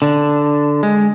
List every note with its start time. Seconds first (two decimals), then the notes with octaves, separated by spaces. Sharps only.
0.02 D3 D4
0.83 G#3